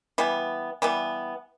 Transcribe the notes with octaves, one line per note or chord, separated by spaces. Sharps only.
E3 G3 B3
E3 G3 B3